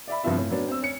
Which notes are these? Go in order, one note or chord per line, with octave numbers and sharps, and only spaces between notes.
D5 E5 B5
G2 C3 F3 B3 F4 E5
A2 C#4
F#3 B3 C#4 D4
C4 E6
C#4 C#7